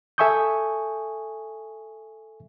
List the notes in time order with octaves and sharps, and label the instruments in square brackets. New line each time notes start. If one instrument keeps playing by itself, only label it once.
[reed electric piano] A4 E5 G#5 C#6 D#6 G6